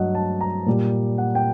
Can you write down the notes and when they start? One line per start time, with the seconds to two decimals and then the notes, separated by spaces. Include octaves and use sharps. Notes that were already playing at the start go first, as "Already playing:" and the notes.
Already playing: G2 F#3 D#5 F#5
0.15 A5
0.41 A#5
0.66 A#2 G3
1.18 F#5
1.35 G5